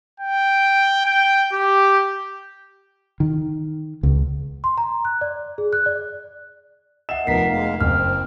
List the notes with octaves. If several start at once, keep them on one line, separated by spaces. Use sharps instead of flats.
G5
G5
G4
D#3
C#2
C6
A#5
F#6
D5
G#4
F#6
D5
D#5 E5 F#5 E7
F1 F3 B3 A#4 B6 C7
G#3 A#3 F5
F#1 C4 F6